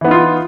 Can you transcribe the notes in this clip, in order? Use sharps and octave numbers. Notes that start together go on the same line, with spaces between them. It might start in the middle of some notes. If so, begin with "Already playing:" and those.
E3 B3 D#4 F4